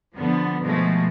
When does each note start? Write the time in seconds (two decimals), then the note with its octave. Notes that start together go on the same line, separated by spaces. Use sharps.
0.15 D3 F3 B3
0.61 B2 F3 G#3 A3